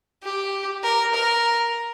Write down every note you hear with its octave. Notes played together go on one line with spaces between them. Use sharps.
G4
A#4
A#4